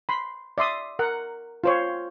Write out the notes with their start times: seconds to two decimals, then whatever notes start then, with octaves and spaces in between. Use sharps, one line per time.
0.09 B5 C6
0.58 D5 E5 C6 D#6
0.99 A#4 F#5
1.64 F4 C5 C#5